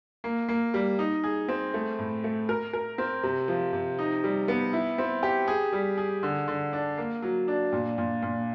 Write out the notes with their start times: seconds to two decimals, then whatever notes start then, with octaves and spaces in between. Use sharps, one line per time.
0.24 A#3
0.49 A#3
0.74 G3
0.99 D#4
1.24 G#4
1.48 C4
1.74 A3
1.99 A2
2.24 A3
2.49 A#4
2.73 A#4
2.98 C4
3.23 C3
3.48 F3
3.73 C3
3.98 D#4
4.24 G3
4.48 B3
4.73 E4
4.98 C4
5.23 G4
5.48 G#4
5.73 G3
5.98 G#4
6.23 D3
6.48 D3
6.73 D4
6.98 A#3
7.22 F#3
7.48 D4
7.72 A#2
7.98 A#2
8.22 A#2